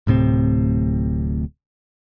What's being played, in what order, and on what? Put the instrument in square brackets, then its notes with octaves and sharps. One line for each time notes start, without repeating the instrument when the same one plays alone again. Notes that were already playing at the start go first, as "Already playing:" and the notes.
[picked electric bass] D1 A2 C3 C4